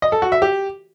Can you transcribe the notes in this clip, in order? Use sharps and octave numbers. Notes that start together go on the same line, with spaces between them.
D#5
A4
F#4
E5
G4